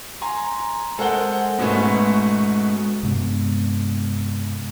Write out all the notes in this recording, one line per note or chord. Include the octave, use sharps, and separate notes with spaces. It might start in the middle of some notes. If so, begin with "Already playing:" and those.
G#5 A#5 C6
G#3 A4 A#4 C5 F#5 G7
G#2 B2 G#3 A3 B3 C#4
G2 C3 G#3 B3